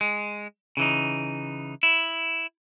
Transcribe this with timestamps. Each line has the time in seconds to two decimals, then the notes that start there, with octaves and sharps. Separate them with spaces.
0.01 G#3
0.77 C#3 E3 D#4
1.83 E4